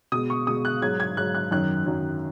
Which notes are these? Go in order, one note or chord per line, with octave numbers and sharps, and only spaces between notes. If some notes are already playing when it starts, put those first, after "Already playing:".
B2 G#3 D#6
C#6
B2 G#3 D#6
F#6
G#2 F#3 G#6
G#6
G#2 F#3 F#6
F#6
F#2 D#3 F#3 F#6
F#2 D#3 F#3